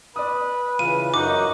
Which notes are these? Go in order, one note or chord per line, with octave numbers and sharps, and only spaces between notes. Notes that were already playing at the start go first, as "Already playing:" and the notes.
B4 D5 D#6
C#3 E3 F4 D#7
F#2 D#4 F#4 D6
D#5